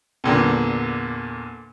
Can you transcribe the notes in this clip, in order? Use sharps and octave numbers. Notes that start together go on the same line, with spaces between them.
E2 A#2 D3